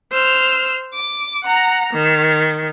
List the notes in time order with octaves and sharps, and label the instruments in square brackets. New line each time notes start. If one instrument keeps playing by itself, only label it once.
[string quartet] C5 E6 F6
D6
F#5 A#5
D#3